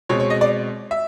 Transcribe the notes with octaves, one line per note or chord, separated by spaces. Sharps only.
B2 G#3 C4 C#5
C#5
D#5
D5
E5